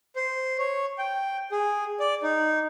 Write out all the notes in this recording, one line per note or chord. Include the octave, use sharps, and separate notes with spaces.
C5
C#5
G5
G#4
D5
D#4